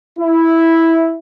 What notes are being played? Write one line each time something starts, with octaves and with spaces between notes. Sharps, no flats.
E4